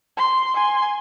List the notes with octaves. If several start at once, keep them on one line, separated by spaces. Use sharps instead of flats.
C6
G#5 C6